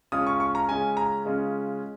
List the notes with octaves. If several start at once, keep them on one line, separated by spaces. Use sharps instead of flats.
C#3 G#3 C#4 F4 D#6
C#6
C#6
A#5
C#3 G#3 C#4 F4 G#5
A#5
C#3 G#3 C#4 F4